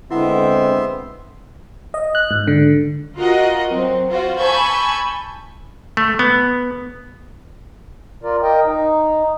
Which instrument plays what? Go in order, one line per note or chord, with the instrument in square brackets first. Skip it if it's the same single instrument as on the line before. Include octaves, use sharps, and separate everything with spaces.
[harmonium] D3 G#3 [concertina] B3 E5 C6 [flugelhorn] C4 [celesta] E4 F#5
[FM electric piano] D#5
F#6
G#2
D3
[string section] F4 F#4 A#4 D#5 F#5
F#3 C4
F4 F#4 C5
G#5 A5 B5 C#6 E6 G6
[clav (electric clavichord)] A3
B3
[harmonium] F4 A#4 D5
A#4 D#5 G5
D#4